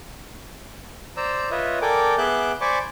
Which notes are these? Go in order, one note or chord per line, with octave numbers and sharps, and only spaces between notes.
C5 D5 A#5 E6
F4 B4 C#5 D#5 E5
A4 A#4 D5 G5 G#5 D6
B3 G#4 E5 D6 F#6 G6
C5 D5 G#5 B5 C#6 D6